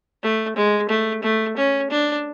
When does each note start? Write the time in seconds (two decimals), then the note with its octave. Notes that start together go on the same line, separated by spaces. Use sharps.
0.23 A3
0.56 G#3
0.89 A3
1.23 A3
1.57 C#4
1.90 D4